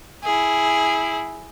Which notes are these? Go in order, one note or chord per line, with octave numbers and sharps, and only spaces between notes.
E4 G#4